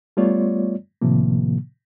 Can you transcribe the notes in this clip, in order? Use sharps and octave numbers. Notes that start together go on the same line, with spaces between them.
G3 A3 B3 F4 C#5 D5
A2 C3 D#3 F3 A#3